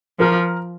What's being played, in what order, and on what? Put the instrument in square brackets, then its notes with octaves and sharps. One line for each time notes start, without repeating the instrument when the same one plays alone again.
[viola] F3 [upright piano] A#4